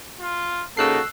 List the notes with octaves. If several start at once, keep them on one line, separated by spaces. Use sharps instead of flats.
F4
C#3 A#3 D#4 F#4 A4 E6 F#6 C7